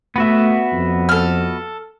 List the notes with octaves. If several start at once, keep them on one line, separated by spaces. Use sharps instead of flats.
A3 B3 F#4 E5
F2
A4 F6